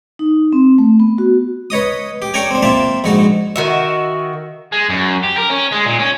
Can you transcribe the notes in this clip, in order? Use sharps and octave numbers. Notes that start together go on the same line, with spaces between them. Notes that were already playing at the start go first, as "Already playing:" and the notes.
D#4
C4
A3
B3
F#4
B4 C#5 D#5 D#6
G4
A4 C#5 D5 G5 G#5 A#5
C4 D4
A#3 C4 F4 E5 A5
A#1 G#2 F#4 A4
D#3 F#4 E5
G#3
F#2
G4
A#4
C#4
G#3
A#2
C#4